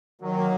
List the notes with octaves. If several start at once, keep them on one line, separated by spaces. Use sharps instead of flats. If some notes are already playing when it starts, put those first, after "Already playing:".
D#3 F#3
A#3